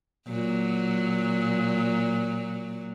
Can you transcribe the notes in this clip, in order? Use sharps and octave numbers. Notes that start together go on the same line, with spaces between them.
A#2 F#3